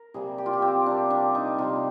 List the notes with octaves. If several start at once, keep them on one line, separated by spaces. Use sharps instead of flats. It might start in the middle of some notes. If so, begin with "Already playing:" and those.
Already playing: A#4
C3 G3 A#3 G#4
G4
F4
G4
C4
C3 G3 A#3 D4
D4
D#4
C3 G3 A#3 F4